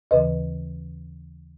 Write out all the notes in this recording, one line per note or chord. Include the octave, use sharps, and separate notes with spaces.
D#2 C#3 E3 B4 D#5